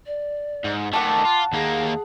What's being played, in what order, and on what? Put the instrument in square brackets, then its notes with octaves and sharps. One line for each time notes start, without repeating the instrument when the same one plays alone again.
[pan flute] D5
[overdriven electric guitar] G#2
[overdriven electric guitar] D#3 A3 [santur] F#5 A5 [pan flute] D6
[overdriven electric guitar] F4
[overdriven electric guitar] D#2 A#3 [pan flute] G#4